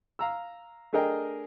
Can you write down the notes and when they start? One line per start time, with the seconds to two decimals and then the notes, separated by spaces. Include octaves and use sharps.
0.19 F5 A#5 E6
0.93 A3 D4 G#4 A#4 D#5 G5